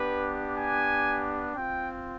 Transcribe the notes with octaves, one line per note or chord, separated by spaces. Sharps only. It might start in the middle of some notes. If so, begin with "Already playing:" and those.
Already playing: B3 D4 G4 B4
G#5
C4 F4 G5